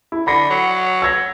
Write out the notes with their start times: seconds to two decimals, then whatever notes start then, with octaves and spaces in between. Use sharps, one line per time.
0.12 E4
0.27 D3 B5 A#6
0.50 F#3
1.02 E6 G#6 A#6